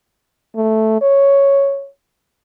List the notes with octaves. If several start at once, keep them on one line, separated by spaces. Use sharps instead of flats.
A3
C#5